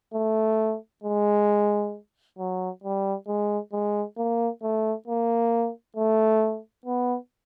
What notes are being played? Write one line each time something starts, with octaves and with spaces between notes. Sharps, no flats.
A3
G#3
F#3
G3
G#3
G#3
A#3
A3
A#3
A3
B3